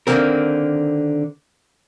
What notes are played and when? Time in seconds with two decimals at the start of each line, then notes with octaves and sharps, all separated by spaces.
0.07 D3 D#3 A#3 C4 A#4